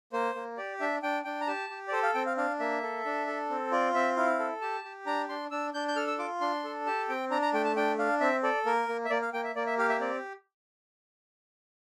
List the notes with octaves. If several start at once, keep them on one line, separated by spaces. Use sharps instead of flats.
A#3 C5
A#3
G4 D5
D4 E5
D4 G5
D4 G5
A#5
G4 A5
G4
D5
A4 C5
F5
C4 G5
F5
D4 F5
A#3 E5
A4
D4
A4
C4
F4 D5
C4 E5
E4 F5
A4
G4 A5
G4
D4 A#5
D4 C6
D4 E6
D4 G6
G6
A4 F6
E6
F4 D6
D4 C6
A4
G4 A5
C4 G5
D4 A#5
A#5
A3 G5
A5
D4 G5
D4 F5
C4 E5
A4 D5
A#3 A#4
A#3
E5
A#3 D5
F5
A#3 G5
E5
A#3 D5
E5
G4 F5
E5
C4 D5